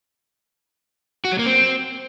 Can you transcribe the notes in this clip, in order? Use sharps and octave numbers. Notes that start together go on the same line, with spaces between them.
F#4
F#3
A#3
C4